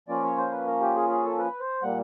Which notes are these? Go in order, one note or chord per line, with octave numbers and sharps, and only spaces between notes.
F3 A#3 C#4 F4 D5
C#5
C5
B4
A#4
G4
G#4
G#4
A4
B4
C5
A#2 G3 A#3 F#5